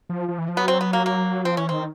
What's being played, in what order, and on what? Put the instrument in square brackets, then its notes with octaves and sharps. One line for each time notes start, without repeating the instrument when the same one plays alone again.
[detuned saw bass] F3
F3
E3
F3
[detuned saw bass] F#3 [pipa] B3
[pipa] C4
B3
A#3
A#3
[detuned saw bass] F3 [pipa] C4
[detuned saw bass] E3 [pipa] C#4
[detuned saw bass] D#3 [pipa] C4